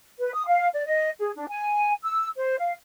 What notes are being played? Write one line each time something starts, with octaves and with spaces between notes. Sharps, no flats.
B4
D#6
F5
D5
D#5
G#4
D4
G#5
E6
C5
F5